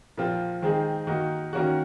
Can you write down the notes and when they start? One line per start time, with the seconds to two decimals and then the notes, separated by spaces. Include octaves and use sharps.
0.18 A#2 F3 C4 F4
0.62 D#3 G#3 C4 D#4 G#4
1.07 D#3 A#3 D#4 F#4
1.53 D#3 A#3 C#4 F#4